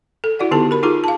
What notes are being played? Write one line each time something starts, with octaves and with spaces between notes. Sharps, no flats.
A4
E4 F#4 D5 F#5
D3 B3 D#4 G4 A4 A5
A#4 B5
D#4 F4 G#4 A#5
F5 A5